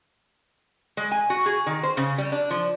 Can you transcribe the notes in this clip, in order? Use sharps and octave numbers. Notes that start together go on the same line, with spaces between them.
G#3
G#5
F#4
G#4
D#3
C5
C#3
G3
D4
F3